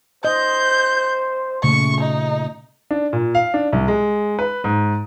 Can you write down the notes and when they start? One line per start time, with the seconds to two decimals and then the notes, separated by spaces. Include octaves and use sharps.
0.25 C5 D#5 G6
1.63 A#2 C#3 A3 C#6
2.01 D#4
2.91 D4
3.13 A#2
3.35 F5
3.54 D4
3.73 C2
3.88 G#3
4.39 B4
4.64 G#2